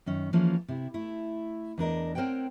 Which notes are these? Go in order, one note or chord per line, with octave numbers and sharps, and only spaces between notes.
F#2 D#3 C#4
E3 F3 G#3 A#3 C#4
C3 E4
A3 E4
E2 D4 A#4 D#5
C4 A#4 C5 C#5 F#5 G5